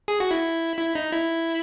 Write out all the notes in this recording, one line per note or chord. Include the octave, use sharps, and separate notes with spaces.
G#4
F#4
E4
E4
D#4
E4